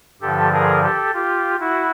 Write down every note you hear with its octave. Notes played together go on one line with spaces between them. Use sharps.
G2 D3 F3 G4 A4
G#4 A#4
G4 A4
F4 G4
E4 F#4